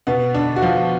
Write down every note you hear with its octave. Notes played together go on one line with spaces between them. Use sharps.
B2 B3
D3 D4
F#4
F3 F4